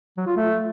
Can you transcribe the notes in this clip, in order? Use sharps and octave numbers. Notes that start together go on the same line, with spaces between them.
F#3
F4
A3